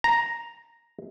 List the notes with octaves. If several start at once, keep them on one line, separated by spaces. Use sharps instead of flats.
A#5